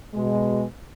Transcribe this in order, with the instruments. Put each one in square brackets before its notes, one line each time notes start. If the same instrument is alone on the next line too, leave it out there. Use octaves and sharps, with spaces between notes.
[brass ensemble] B2 G#3